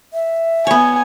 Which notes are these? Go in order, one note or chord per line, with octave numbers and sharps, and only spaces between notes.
E5
B3 C#5 G#5